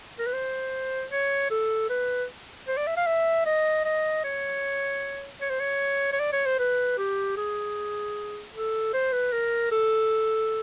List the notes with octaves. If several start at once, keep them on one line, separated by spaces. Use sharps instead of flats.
A#4
B4
C5
C#5
A4
B4
C5
D5
E5
F5
E5
D#5
D#5
C#5
C#5
C5
C#5
C#5
D5
C#5
C5
B4
G4
G#4
A4
C5
B4
A#4
A4